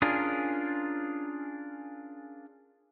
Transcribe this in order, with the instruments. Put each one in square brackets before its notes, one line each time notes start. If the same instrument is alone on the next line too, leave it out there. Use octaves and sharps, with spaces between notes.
[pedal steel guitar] C#4 D4 F4 G#4 A#4